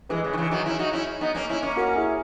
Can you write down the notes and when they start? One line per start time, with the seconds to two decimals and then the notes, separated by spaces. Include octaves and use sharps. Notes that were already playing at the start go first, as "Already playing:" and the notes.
0.09 E3 G#3 G#4 B4
0.24 C#3
0.33 D#3
0.37 C#3 E3
0.51 D#3 F#3
0.66 C#4 E4
0.79 D#4 F#4
0.93 C#4 E4
1.21 B3 D#4
1.35 A#3 C#4
1.50 C#4 E4
1.62 A#3 C#4
1.76 F#4 A#4
1.96 E4 G#4